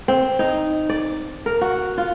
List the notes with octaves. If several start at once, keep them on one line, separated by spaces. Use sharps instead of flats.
C4
D#4
D5
A#4
F#4
F4